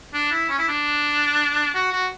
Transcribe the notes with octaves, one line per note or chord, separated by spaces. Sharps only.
D4
E4
C#4
E4
D4
F#4
F#4